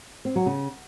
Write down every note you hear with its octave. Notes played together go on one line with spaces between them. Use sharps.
C4
F#3
C#3